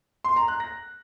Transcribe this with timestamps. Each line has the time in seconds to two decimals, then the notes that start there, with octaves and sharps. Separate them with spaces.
0.24 C6
0.36 A#5
0.48 F#6
0.60 A#6